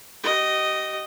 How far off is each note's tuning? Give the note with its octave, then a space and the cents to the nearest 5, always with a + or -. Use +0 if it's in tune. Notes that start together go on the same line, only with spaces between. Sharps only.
G4 -40 D#5 +0